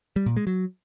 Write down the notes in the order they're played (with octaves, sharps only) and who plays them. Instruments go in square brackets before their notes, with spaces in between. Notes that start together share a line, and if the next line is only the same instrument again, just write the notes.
[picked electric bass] G3
A#2
G#3
F#3